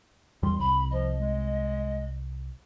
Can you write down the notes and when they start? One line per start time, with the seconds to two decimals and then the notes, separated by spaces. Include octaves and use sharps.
0.43 E2 G3 C6
0.59 C2 B5
0.90 F3 D#5
1.18 G#3